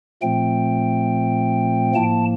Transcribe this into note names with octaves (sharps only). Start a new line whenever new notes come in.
A#2 F3 A3 C4 G5
A2 F3 A#3 A5